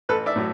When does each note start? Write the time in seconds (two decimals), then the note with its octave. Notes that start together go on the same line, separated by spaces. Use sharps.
0.09 A1 A4 B4
0.26 D5 E5
0.36 A2 F#3